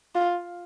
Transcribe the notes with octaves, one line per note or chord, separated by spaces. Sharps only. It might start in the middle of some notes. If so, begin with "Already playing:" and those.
F4